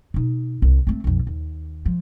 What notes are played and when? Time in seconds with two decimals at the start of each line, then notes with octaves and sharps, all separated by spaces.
0.14 B2 D#4
0.62 C2
0.87 A3 C4
1.04 B1 F2
1.27 D#2
1.86 F3